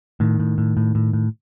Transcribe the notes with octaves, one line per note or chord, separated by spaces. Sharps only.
A2 D#3
A2
A2
A2
A2
A2